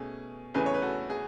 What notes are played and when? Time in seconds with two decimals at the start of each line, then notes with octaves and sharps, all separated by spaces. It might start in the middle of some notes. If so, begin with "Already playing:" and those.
Already playing: B2 A3 C#4 G#4
0.54 E2 C#3 E3 A3 C#4 G#4 B4
0.66 C#5
0.74 B4
0.82 F#4 A4
1.10 G#4